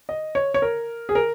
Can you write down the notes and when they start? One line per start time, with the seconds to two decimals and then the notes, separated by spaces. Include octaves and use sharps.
0.09 D#5
0.35 C#5
0.54 C#5
0.62 A#4
1.09 G#4
1.15 A#4